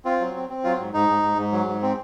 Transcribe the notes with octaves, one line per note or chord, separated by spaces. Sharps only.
C4 F4
F#3
C4
C4
F#3 F4
G#2
G#2 D#4
G#2
G#2
G#2
F#3
G#2
C4